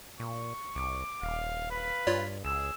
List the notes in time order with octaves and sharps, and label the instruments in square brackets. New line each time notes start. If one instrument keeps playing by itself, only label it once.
[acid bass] A#2 [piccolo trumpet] C#6
[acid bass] C2 [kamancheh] D6
[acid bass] D#1 [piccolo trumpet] F5
[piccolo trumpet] B4 [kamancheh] F5 B5
[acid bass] G2 [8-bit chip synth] F4 C#5 D5
[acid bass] C#2 [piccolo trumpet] G#4 [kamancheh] E6